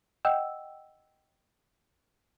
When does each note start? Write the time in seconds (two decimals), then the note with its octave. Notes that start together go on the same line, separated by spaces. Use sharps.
0.25 D#5 F#5 G5 E6